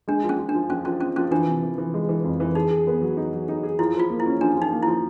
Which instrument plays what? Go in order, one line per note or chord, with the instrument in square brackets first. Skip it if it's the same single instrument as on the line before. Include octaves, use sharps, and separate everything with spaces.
[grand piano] G#3 [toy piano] D4
[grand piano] F3
[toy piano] C#4
[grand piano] F3
[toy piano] D4
[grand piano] F3
[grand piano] F3 [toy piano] C#4
[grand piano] F3 [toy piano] C#4
[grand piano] C4 [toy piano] C#4
[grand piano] F3 [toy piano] C#4
[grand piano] E3 [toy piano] D4
[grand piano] C3
E3
E3
G#3
E3
F2
E3
[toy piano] D#4 [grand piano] G#4
[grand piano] G#4
B3
F#3
D#4
F#3
D#4
G#4
[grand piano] F3 [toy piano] E4
[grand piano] F3
[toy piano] F4
[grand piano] A#3
[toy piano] E4
[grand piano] C#4
[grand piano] F3 [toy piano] D4
[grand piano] F3
[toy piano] D#4
[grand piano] A#3
[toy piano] E4
[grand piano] F3